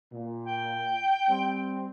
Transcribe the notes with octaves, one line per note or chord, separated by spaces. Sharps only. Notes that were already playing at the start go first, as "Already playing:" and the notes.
A#2
G5
G3 C4